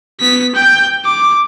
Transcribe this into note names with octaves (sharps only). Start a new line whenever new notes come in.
B3 B6
G5 G6
D6